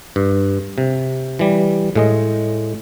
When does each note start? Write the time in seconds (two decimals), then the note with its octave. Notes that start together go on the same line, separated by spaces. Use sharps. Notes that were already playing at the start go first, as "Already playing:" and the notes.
0.16 G2
0.78 C3
1.39 E3 G3
1.95 A2 G#3 D#5